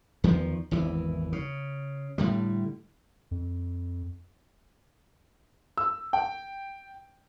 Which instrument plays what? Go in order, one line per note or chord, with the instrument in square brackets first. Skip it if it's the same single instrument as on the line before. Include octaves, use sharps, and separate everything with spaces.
[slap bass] E2 D#3 F3
G#1 E2 E3
C#3
A2 D3 G3
[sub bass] F2
[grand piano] E6
G5